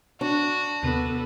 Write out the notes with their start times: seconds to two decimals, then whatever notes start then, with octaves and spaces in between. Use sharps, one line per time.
0.21 D4 F#4
0.82 D#2 C3 B3 A4 D#7